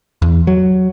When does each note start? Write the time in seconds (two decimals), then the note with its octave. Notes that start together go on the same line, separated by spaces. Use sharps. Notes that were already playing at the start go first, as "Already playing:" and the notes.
0.22 E2
0.47 F#3